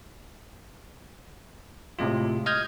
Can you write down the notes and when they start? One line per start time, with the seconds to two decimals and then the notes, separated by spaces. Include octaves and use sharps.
1.99 A2 C3 G#3 F4
2.46 D#5 D#6 F6 G6 G#6